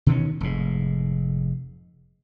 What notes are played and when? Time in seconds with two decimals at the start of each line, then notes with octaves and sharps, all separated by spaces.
0.06 B2 D#3 E3 C#4
0.41 F1 G#2